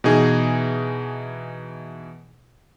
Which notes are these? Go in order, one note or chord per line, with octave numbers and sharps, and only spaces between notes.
B2 E3 D#4 G#4